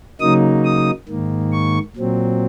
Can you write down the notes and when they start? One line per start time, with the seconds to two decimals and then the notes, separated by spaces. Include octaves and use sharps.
0.20 C#3 F#3 A#3 D#4 D#6
0.65 D#6
1.08 G#2 D#3 A#3
1.52 C#6
1.96 A#2 F#3 C4